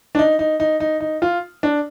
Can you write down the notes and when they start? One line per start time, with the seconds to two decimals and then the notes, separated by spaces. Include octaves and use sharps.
0.15 D4
0.19 D#4
0.39 D#4
0.60 D#4
0.80 D#4
1.00 D#4
1.22 F4
1.63 D4